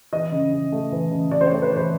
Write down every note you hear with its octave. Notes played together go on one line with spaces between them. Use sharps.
E3 D#5
C#3
C#3
A3
E3
C#3
C#3 D5
C5
C#5
A3
B4
E3 C5